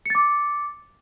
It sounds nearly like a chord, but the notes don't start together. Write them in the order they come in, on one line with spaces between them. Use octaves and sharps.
C#7 A6 D6